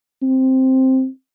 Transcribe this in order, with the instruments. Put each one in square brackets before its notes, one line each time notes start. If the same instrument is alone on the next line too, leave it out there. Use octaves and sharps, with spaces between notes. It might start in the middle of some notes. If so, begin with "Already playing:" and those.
[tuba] C4